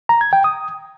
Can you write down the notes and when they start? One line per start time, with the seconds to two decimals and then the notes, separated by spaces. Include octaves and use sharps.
0.09 A#5
0.21 G#6
0.33 G5
0.44 D#6